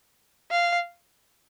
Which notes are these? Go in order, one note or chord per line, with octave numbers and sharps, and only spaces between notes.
F5